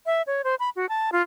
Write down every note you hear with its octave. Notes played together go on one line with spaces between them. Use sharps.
E5
C#5
C5
B5
F#4
A5
F4